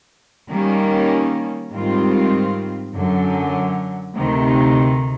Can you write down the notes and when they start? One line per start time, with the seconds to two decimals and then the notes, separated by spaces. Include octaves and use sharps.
0.49 D#3 G3 A#3 C#4
1.71 G#2 D#3 G3 C4 F4
2.93 F#2 D3 F#3
4.14 D2 C3 D#3